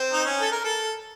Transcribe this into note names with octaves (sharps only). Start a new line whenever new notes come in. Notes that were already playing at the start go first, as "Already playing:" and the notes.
Already playing: C4
D#4
C#4
A4
A#4
A4